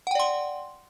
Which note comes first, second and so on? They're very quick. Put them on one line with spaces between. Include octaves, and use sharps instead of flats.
F#5 G5 D5 C6